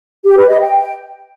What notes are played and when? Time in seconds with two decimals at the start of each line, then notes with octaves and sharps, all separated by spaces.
0.25 G4
0.37 B4
0.49 D#5
0.60 G5